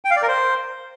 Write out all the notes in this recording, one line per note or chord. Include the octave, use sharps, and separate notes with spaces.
G5
F5
D5
A#4
C5